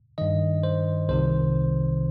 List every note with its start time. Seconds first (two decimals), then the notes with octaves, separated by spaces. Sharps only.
0.18 G2 D#3 D#5
0.63 C5
1.09 C2 C3 D#3 C5